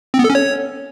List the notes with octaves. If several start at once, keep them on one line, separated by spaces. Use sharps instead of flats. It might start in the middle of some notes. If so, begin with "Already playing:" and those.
C4
B3
A4
C#4
C#5